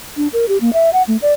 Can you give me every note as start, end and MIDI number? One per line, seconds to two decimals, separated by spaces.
0.17 0.28 62
0.33 0.48 70
0.48 0.58 67
0.61 0.73 58
0.73 0.90 76
0.93 1.02 78
1.08 1.17 57
1.22 1.33 74